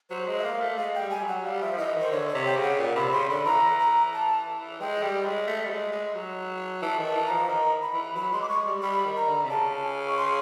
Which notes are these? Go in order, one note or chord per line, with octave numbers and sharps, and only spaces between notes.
F#3 C5
G#3
E5
A#3 F5
A3
G#3 F5
G5
G3
G3 G#5
F#3
F#5
G3 F5
F3 E5
F3
E3 D#5
D#3
C5
D3 C#5
C#5
C3
G5
C#3
F#5
A#2
C3 B5
C#3 C6
D3 B5
E3 A#5
A#5
A5
G#3 G5
G3
G#3
A3
G3
G#3
G#3
F#3
E3 A5
D#3
A5
E3
A#5
F3
D#3 A#5
B5
E3
F#3 B5
G#3 C6
D6
G#3 C#6
G3
G3 B5
D#3
A#5
D3
C3
C#3 A5
G#5
C#6
C6